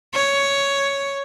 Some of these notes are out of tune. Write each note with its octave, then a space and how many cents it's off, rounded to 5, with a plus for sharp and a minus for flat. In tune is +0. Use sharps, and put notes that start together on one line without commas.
C#5 +5